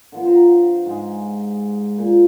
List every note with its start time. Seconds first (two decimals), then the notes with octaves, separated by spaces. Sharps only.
0.12 D3 F3 B3
0.25 C5 A#5
0.86 G#2 G3 G#3
1.98 A#2